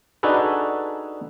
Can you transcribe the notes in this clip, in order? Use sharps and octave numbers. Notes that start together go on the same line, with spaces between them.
D4 D#4 F#4 G#4 A4 B4